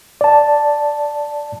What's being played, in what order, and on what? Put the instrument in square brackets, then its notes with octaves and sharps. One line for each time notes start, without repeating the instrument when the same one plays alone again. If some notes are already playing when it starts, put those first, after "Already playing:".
[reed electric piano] D5 A5